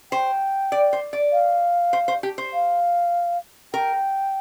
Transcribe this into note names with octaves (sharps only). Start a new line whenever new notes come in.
C5 G5
D5
C5
D5
F5
C5
C5
G4
C5
F5
A#4 G5